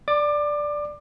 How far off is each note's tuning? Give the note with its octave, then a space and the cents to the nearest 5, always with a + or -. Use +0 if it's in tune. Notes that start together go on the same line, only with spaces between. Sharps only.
D5 +0 D6 +25